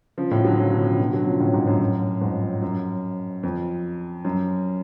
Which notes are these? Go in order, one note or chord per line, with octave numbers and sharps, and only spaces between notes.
C#3 F3
A2 C#3
D3 F#3
C#3 F3
B2 D3
C#3 F3
B2 D3
D3 F#3
C#3 F3
A2 C#3
G#2 B2
F#2 A2
F2 G#2
F#2
F2
F#2